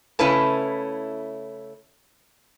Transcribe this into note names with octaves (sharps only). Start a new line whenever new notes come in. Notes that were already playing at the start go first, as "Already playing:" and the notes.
C#3 A3 C#4 E4 B4 A5